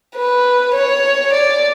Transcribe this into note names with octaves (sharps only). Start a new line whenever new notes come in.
B4
C#5
D5